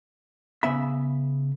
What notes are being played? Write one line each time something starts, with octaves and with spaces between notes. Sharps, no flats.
C#3 B3 E5 B5